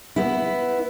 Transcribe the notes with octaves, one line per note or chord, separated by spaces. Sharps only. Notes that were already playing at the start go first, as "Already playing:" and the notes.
B3 E4